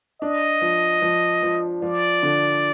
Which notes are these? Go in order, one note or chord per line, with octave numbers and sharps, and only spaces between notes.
D4 D#5
F3
F3
F3
F3 D5
D3